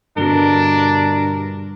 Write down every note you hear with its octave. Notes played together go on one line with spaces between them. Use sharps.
G2 B2 D3 D4 A#4 G7